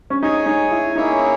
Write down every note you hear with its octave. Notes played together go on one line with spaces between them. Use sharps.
C#4
D#4 G#4 C#5 G#5
D#4
E4
A#3 C#4 D#4 E4 G#4 C#5